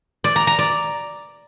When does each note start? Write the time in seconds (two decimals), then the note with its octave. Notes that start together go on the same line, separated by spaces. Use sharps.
0.24 D5
0.36 A#5
0.47 A#5
0.59 D5